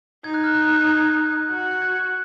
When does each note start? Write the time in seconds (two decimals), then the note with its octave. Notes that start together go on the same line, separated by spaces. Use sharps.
0.24 D#4 G#6
0.34 F#6
0.44 F6
0.55 F#6
0.87 G#6
1.50 F#4 F#6
1.71 F#6
1.82 G#6